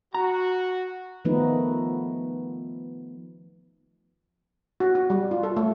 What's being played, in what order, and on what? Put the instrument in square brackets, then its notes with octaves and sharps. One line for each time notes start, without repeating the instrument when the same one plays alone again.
[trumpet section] F#4 [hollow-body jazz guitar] A#5
[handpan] D#3 F3 A3 B3 D#4 B4
[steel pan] F#4
F#4
G3
F4
A4
A3